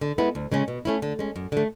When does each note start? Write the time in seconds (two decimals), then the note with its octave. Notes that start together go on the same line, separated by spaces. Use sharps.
0.01 D3
0.18 G#3 B3 E4
0.35 D2
0.52 C#3 G#3 C#4
0.68 B2
0.85 A3 C#4 E4
1.02 D3
1.19 G#3 C#4
1.36 F#2
1.52 D3 A3